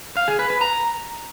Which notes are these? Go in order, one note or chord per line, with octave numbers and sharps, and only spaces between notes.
F5
G#4
B4
B4
A#5